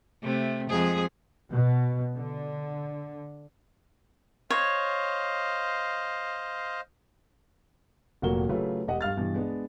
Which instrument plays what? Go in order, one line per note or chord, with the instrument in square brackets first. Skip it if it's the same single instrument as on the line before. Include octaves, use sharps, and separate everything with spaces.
[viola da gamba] C3 A3
F2 G#3 G#4
[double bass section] B2
D3
[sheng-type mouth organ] C5 D#5 F5 [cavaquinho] C#5
[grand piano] F1 A#2 F#3 F#4 A#4 G7
C#3 F#3 A3 F4 G4 B4
E1 G4 D#5 F#5
G2 F5 F6 A6
G2 B2 E3
G#3 B3 D4